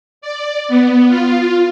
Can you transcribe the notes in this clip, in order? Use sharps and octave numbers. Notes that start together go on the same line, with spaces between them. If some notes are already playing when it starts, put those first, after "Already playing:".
D5
B3
F4